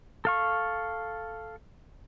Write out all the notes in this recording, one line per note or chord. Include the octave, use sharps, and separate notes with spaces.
A4 F5 C#6